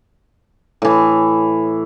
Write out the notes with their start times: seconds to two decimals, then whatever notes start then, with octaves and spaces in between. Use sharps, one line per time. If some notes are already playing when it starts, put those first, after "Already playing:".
0.82 A2 E3